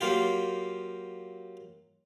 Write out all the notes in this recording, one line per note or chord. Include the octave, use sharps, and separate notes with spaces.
F#3 A#3 F4 G4